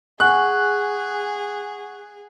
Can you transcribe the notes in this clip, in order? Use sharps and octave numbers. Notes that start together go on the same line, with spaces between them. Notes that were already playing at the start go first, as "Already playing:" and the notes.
G#4 F#5 G#5 C#6 F#6